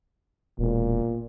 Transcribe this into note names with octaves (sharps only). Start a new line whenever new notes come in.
E1 A#2